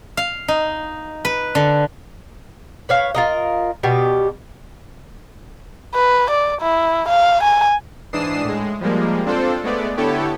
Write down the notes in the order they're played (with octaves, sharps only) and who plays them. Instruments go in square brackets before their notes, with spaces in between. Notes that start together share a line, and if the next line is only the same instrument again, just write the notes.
[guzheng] F5
D#4
B4
D3
[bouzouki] B4 C#5 F5
F4 A#4 D#5
B2 G3 G4
[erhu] B4
D5
E4
F5
G#5
[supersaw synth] G#2 E3 D4 D#6 C7 E7
A2 G#3
F3 G3 G#3 A#3
C4 D4 F4 A4 C5
G#3 A3 B3 D5
D3 B3 E4 G4 A4 C#5